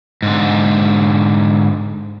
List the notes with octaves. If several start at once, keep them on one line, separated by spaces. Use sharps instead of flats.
G#2 D3